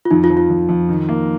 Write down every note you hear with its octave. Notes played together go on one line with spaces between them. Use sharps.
F4
F2 D#4
F4
F3
F4
F2
F2
D#3
A#3